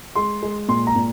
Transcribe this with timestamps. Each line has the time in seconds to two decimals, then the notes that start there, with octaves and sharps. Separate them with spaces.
0.15 G#3 C6
0.43 G#3
0.69 A#2 C6
0.87 A#5
0.96 A#2